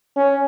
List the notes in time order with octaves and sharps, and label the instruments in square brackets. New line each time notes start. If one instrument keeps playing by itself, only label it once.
[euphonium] C#4